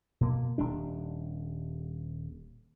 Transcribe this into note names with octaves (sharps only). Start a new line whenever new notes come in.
B2 A#3
D#1 G3 D4